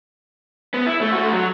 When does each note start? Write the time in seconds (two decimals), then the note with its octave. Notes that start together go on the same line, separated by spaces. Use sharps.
0.74 B3
0.87 E4
1.01 A3
1.12 A3 F#4
1.33 F#3